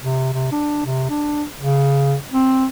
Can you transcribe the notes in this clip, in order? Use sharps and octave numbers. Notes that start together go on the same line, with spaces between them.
C3
C3
D4
C3
D4
C#3
C4